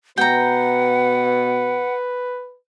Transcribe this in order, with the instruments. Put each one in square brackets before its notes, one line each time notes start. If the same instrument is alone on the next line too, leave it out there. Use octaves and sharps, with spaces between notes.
[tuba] B2 [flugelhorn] B4 [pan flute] F#5 [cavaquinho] G5 A#5